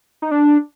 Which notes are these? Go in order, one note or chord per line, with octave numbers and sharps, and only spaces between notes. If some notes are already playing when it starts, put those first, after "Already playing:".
D#4
D4